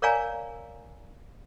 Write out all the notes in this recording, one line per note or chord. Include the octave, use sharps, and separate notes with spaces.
A#4 C#5 D5 F5 G#5 A#5